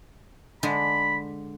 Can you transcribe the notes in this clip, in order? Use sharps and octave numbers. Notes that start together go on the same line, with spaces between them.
D3 G#3 B5